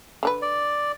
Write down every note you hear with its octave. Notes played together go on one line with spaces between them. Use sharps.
D3 D4 B4
D5